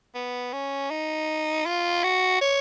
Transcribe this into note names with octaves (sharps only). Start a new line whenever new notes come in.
B3
C#4
D#4
F4
F#4
C#5